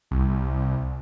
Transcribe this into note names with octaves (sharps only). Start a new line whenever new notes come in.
C2